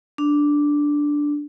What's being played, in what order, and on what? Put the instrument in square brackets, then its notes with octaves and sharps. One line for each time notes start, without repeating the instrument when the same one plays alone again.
[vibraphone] D4